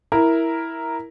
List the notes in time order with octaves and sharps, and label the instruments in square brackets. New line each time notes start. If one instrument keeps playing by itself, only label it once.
[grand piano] E4 A#4